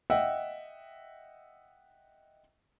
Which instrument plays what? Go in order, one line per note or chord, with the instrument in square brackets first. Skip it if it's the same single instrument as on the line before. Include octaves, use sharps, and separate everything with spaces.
[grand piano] D#5 E5 F#5 G5 E6